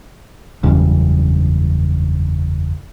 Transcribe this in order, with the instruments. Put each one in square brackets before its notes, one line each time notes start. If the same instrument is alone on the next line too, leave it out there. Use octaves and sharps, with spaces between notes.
[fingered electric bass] F#1 E2 G2 C#3